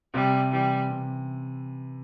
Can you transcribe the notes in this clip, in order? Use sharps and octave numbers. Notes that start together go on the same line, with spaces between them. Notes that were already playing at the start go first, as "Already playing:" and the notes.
C3 G3
E3 G3
C3